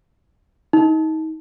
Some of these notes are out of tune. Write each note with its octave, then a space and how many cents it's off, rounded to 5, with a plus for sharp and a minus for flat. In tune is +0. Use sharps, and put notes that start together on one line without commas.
D#4 +30